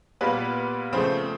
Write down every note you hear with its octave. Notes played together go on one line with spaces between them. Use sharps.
A#2 G3 A#3 B3 B4
C#3 F3 A3 C4 C5